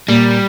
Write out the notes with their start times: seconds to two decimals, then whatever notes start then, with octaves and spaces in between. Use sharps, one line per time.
0.08 A#2 G3